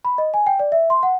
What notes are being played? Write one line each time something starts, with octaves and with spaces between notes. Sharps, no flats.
B5
D#5
G#5
G5
D5
E5
C6
F#5